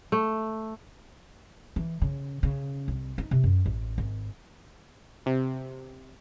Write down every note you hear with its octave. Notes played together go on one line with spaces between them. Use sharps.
A3
E3
C#3
C#3
C2
D#4
C3
F#2
A1
G#1
C3